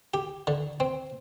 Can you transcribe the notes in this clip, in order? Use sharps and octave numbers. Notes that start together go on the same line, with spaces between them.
G4
D3
C4